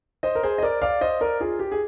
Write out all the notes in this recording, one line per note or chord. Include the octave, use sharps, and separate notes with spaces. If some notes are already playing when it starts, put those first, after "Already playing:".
C5 D#5
A#4
G#4 C5
D#5
A#4 D5
D5 F5
C5 D#5
A#4 D5
F4 G#4
G4
G#4